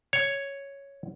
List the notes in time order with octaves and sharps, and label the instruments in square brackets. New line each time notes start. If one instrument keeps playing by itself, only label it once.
[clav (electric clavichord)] C#5